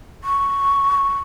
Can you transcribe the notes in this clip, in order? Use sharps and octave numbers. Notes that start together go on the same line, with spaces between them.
C#6